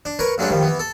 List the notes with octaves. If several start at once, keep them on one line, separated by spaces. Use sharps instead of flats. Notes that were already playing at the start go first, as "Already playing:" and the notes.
D4
A#4 B4 C#5
G2 F#3 G#3 A3 C#4 D4
D#3 F3 G3
E3 B3
A4